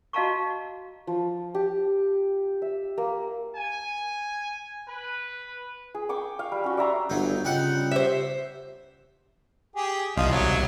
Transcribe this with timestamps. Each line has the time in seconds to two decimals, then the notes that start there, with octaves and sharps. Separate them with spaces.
0.13 F#4 D#5 F5 A5 A#5 C#6
1.07 F3
1.55 G4
2.62 E5
2.98 A#3
3.56 G#5
4.87 B4
5.95 G#4
6.09 G5 C#6 D6
6.39 F5
6.52 G3
6.64 C#4 F#4
6.77 D5 E5 A#5 C6
7.10 G1 F#3 D4 D#4
7.45 C#3 G3 D#4 F4 F#5
7.91 G4 C5 E5
9.76 G4 G#4
10.17 C2 F3 D#5 F5
10.31 F#3